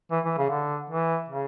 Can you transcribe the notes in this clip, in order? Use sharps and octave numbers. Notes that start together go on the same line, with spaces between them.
E3
E3
C#3
D3
E3
C#3